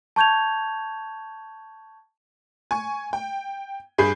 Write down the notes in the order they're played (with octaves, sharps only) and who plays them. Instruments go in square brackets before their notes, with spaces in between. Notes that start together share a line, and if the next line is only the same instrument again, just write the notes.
[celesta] A5 C#6 G6 G#6 F7
[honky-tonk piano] G#5 C#6
G5
G2 G#4 B5 G6 C7